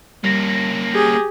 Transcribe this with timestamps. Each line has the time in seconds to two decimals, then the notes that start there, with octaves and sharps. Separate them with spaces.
0.24 G3 A#3 C#4 A#6
0.93 G4 G#4